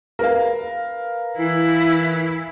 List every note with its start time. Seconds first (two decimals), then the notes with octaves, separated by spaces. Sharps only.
0.19 A#4 B4 F5
1.39 E3 E4